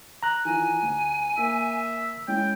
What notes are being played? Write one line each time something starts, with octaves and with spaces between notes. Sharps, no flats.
A#5 F#6
D#3 E3 F4 G#5
D2
A#3 E5
G#3 C#4 E4 G5